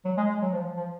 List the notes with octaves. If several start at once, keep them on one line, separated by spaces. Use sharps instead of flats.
F#3
G#3
G#3
F#3
F3
F3
F3